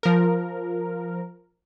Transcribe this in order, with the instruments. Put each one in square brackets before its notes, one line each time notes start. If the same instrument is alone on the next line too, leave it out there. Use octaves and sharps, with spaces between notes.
[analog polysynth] F3 A#4